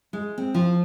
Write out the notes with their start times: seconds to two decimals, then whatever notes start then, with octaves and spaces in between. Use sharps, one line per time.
0.13 G#3
0.38 C4
0.54 F3